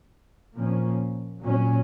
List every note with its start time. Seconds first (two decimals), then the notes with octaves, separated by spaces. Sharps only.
0.54 A#2 F3 A#3 C#4
1.41 A#2 F#3 C#4